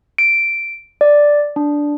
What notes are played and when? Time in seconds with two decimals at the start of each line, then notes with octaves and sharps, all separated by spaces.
0.18 D7
1.01 D5
1.56 D4